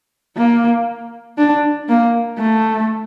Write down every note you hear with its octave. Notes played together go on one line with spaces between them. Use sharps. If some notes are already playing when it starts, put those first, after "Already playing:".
A#3
D4
A#3
A3